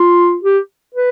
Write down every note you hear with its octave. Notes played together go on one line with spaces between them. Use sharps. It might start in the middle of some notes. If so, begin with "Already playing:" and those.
Already playing: F4
G4
B4